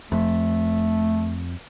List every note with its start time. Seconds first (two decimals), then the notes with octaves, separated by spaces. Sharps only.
0.12 F2 A3